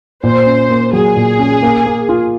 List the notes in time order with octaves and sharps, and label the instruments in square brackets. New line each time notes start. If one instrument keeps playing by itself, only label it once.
[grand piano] A#2 [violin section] C5
[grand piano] C#4
A#3
[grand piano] F#3 [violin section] G#4
[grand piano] A#2
C#4
A#3
A#3
F4